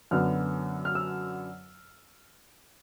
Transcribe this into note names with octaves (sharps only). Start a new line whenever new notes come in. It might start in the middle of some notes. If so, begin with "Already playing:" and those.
F#2 D3 F#3 B3 F6
F6
E6